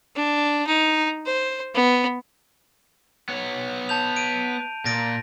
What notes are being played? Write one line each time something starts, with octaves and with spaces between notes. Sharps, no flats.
D4
D#4
C5
B3
B3 C#5
A5 G6 F7
D7 D#7
A#2 A6 A#6 D7